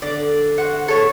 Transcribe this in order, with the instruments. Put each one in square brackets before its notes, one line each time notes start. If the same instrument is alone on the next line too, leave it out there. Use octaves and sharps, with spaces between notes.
[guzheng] D3 [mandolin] D5
[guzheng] F#4 C5 [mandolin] F#5
[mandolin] A4 C#5